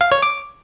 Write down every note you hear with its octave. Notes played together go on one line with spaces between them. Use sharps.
F5
C#5
D6